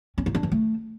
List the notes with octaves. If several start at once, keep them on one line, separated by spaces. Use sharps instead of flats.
C#4
D#4
D4
E3
A3